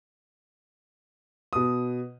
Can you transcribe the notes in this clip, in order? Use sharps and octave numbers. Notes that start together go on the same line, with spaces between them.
B2 D#6